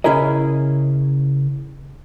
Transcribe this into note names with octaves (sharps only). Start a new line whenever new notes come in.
C#3 C#4 E4 G#4 A#4 D#5